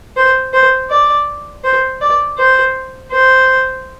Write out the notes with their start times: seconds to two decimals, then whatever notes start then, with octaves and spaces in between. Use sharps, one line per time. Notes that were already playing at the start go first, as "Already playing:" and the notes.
0.16 C5
0.53 C5
0.90 D5
1.64 C5
2.01 D5
2.38 C5
3.11 C5